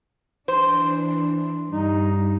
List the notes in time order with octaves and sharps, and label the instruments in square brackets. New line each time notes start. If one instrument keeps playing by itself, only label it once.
[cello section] E3 D4 [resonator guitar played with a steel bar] C5
[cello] G2 [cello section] G3 [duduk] D#4